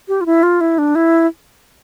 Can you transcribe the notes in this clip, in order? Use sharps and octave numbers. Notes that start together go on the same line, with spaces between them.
G4
F4
E4
F4
E4
D4
E4